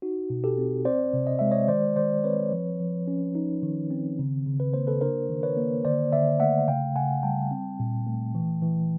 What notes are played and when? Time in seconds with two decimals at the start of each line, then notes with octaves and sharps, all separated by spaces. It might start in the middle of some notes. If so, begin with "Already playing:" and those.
0.02 D#4 F#4
0.30 B2
0.44 G4 A4
0.58 C4
0.85 C4 C5 D5
1.13 C3
1.27 D#5
1.39 G#3 E5
1.51 C#5 D#5
1.68 D#3 C5 D5
1.96 D#3 C5 D5
2.24 C4 B4 C#5
2.52 F3
2.80 F3
3.08 C#4
3.35 D#4
3.63 D#3
3.91 C4
4.19 C#3
4.46 C#3
4.60 B4
4.74 A#3 C5
4.87 A4 B4
5.01 D4 A#4 C5
5.29 D#3
5.43 B4 C#5
5.57 A#3
5.85 D3 C5 D5
6.12 D3 D5 E5
6.40 A3 E5 F#5
6.68 C#3 F5 G5
6.96 C#3 F#5 G#5
7.23 G3 G5 A5
7.51 C4
7.80 A#2
8.07 A3
8.35 E3
8.62 E3